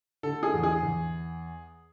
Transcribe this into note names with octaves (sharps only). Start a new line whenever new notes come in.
D3 A4
G#4
E2
G#4
E2